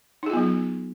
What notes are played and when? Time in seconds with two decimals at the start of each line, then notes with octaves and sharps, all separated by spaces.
0.23 D#4
0.26 G#4
0.30 F4
0.33 B3
0.37 F#3